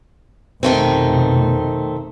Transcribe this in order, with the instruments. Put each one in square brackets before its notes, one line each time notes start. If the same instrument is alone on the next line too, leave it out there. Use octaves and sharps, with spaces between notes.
[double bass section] F1 B2 [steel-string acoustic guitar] D#3 A3 C4